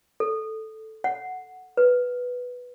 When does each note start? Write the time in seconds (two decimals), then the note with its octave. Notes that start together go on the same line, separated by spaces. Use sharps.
0.20 A4
1.04 F#5
1.77 B4